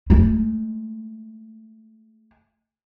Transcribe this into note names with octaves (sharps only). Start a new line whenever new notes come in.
G#3 A3